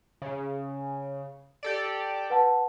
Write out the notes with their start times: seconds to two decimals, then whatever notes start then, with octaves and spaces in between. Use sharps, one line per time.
0.22 C#3
1.63 G4 A4 D5
2.30 B4 F#5 A5